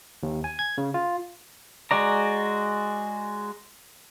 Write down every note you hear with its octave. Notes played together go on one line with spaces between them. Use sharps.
D#2
G#5
G#6
C#3
F4
G#3 F#4 D5 A#5